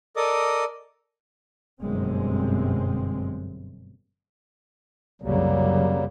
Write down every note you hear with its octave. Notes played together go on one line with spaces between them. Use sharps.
A4 A#4 D5 D#5 D6 D#6
G1 F#2 B2 G#3 C4
C2 F#2 C#3 F#3 G3 A#3